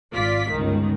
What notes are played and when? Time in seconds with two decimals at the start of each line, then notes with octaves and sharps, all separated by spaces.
0.11 G#1 F4 D5 B6
0.50 G1 C#2 D#3